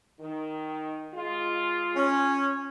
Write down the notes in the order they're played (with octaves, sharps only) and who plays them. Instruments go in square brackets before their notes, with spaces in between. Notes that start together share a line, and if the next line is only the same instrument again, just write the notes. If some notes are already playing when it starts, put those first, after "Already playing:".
[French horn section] D#3
G#3 F4
[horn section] C#4